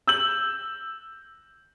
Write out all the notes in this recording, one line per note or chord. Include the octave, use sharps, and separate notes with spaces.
E6 G6 F#7